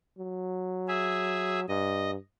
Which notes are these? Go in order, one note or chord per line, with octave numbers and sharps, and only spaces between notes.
F#3
G#4 E5
G2 D#5